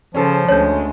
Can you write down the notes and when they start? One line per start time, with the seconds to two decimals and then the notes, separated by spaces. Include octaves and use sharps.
0.15 C#3 F3 C#4 G#4 A4 C5
0.48 D2 G#3 C#4 A4 C#5 G6